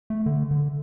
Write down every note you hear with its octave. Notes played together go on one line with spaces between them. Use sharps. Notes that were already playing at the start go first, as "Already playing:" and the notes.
A3
D3
D3